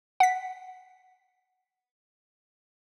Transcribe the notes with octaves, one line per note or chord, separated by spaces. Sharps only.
F#5 B6